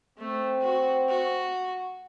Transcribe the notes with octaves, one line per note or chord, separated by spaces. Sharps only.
A3 C4
F#4
F#4